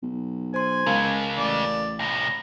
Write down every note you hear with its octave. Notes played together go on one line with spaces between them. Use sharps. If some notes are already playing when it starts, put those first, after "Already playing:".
B1
C5 G#5 C6
C#2 C#3 G#3 A#4 F5 A5
A1 D5
C2 A2 A#5